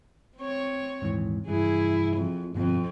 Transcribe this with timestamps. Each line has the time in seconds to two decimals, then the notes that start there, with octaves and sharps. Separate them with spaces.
0.37 C4 C#5
1.02 D#1 G#2 E3
1.47 F1 G2 E3 E4 G#4
2.16 F2
2.55 G1 F2 B2 C4